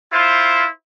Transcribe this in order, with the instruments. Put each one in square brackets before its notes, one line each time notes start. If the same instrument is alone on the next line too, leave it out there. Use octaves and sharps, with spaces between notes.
[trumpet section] E4 F4 C5